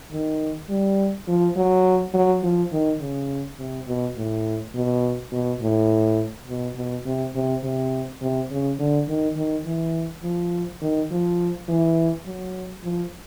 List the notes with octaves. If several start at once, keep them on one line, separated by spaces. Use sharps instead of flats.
D#3
G3
F3
F#3
F#3
F3
D#3
C#3
C3
B2
A2
B2
B2
A2
B2
B2
C3
C3
C3
C3
C#3
D3
D#3
D#3
E3
F3
D#3
F3
E3
F#3
F3